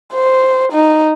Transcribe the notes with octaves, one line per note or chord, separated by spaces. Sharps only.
C5
D#4